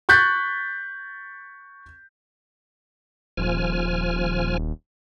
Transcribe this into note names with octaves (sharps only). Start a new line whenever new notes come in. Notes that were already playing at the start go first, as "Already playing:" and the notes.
C#6 F#6 G6 A6 B6
D#1 F3 G#5 F6